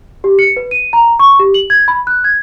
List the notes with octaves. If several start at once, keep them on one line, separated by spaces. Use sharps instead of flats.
G4
C#7
B4
D#7
A#5
C#6
G4
F#7
G#6
B5
F#6
G#6